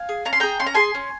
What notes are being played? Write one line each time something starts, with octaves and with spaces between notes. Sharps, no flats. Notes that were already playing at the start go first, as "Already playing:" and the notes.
Already playing: F5 G#5
G#4
C#4 A#5
C6
G#4 G5 A#5
C#4 C6
A#5
G#4 G#5 C6
C#4